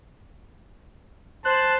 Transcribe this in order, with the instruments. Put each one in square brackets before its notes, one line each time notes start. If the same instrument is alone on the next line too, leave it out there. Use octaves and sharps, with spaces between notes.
[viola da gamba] C5 [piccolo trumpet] A5 [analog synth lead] F#6